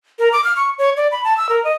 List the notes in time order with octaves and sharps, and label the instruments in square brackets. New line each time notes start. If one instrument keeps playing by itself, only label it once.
[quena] A#4
D6
F6
C#6
C#5
D5
B5
A5
E6
A#4
D#5